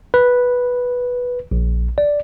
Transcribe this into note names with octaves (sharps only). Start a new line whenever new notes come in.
B4
A#1
D5